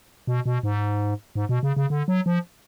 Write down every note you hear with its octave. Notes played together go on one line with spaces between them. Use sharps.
B2
B2
G#2
G#2
B2
C#3
C#3
D3
F#3
F3